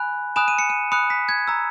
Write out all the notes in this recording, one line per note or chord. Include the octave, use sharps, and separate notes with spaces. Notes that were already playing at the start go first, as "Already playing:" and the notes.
Already playing: G#5 B5 F#6
G#5 B5 D#6 F#6 E7
D#7
C#7
D#7
B5 D#6 F#6 C#7
B6
G#6
A#5 E6